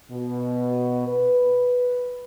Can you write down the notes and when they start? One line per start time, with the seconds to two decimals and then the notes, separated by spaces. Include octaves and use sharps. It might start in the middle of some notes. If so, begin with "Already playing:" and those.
0.11 B2
1.07 B4